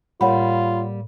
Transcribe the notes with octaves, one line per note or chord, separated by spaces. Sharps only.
A2 G3 A#3 F4 C#5 F#5 B5